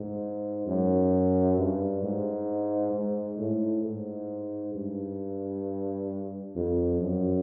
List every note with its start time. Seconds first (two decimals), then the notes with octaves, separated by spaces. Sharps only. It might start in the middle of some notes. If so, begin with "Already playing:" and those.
Already playing: G#2
0.67 F#2
1.57 G2
2.03 G#2
2.93 G#2
3.38 A2
3.84 G#2
4.74 G2
6.56 F2
7.00 F#2